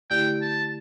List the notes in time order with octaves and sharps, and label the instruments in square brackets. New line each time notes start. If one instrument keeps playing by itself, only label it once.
[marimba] D3 A3 E4 G4 [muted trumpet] G5
[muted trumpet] A5